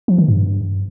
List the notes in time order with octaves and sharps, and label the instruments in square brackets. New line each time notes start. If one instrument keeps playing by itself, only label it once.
[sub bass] F3
D#3
G2